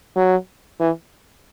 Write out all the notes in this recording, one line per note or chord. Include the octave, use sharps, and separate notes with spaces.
F#3
E3